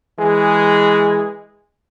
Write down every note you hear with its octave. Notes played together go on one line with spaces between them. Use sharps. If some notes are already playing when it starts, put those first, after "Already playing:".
E3 G#3 G#4